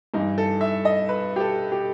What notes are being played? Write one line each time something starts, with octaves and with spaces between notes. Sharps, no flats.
G2 E3 D#4
A4
E5
D#5
B4
G4
A4
G4